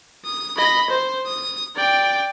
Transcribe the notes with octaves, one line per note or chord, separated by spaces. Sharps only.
D#6
D#5 B5
C5
D#6
D5 G5